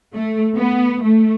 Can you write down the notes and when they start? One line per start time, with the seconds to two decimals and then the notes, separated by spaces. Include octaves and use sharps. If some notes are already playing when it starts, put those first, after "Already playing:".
0.15 A3
0.56 B3
1.03 A3